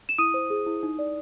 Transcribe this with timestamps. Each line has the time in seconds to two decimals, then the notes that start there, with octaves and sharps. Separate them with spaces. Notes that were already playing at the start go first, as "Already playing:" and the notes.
0.09 E7
0.18 E4 D#6 D#7
0.34 C5
0.50 G#4
0.67 E4
0.83 D#4
0.99 D5